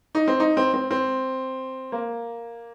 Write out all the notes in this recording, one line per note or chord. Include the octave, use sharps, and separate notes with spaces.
D#4
C4
D#4
C4
C4
C4
A#3